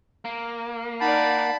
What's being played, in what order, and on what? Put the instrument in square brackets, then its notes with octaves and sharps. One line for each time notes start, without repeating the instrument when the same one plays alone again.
[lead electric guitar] A#3
[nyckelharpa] D#4 D5 [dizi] F#5 [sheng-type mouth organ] A5 B5